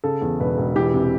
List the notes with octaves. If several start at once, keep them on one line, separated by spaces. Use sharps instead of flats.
C#3 A4
E2
E1 B4
E1
E3 G4
C3